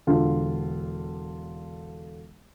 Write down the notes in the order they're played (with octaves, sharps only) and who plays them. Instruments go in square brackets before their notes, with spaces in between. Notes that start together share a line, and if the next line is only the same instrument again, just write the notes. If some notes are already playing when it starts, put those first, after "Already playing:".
[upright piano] E1 D3 F4